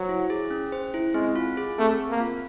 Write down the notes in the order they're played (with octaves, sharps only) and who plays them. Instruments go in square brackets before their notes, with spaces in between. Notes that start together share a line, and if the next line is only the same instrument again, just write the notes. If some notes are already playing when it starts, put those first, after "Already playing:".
Already playing: [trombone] F#3 [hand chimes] C5
[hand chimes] E4
G#4
C#4
C5
E4
[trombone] G#3 [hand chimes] C4
[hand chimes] F4
G#4
[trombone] A3 [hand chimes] C4
[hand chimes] C4
[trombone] A#3
[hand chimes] F4